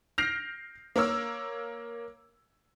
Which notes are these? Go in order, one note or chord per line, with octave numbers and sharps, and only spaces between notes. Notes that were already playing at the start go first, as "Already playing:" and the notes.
F6 G6 A#6 C7 D7 F7
A#3 A#4 C#5 E6